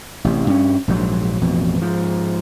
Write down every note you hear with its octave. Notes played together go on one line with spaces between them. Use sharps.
A1 C3
G2 C#4
A#1 G#2 F3 F#3
A1 F2 B2
G#2 F3